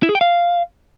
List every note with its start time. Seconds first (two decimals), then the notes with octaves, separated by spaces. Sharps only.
0.03 E4
0.09 G#4
0.15 G5
0.21 F5